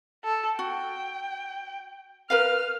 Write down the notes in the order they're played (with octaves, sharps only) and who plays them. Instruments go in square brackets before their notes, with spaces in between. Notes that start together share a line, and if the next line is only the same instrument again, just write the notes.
[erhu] A4
[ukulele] F#4 [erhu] G5
[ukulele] A#4 B4 F5 [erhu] F6